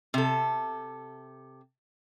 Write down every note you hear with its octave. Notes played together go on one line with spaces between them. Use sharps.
C3 A4